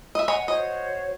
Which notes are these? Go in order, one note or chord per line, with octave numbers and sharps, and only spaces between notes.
D#5 E5
C#5 D#5 F#5 G#5
F#4 C5 C#5 D#5